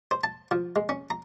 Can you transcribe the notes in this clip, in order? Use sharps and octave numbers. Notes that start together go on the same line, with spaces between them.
C5
A5
F3
G#3
C#4
A#5